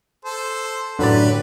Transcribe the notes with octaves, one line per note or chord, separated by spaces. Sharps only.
A4 C5
F#2 A2 D3 F#3 G4 B4 D5